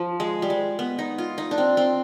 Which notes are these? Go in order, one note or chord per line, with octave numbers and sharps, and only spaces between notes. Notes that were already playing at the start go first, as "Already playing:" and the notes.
Already playing: F3
G#3
G3
G#3
B3
D#4
F4
D#4
D4
C4
C4